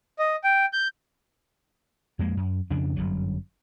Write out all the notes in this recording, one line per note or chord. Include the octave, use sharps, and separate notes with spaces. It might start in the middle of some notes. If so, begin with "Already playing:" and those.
D#5
G5
G6
F2 G#3 A#3
F#2
F2 C#3 D4
G1 F#2 F#3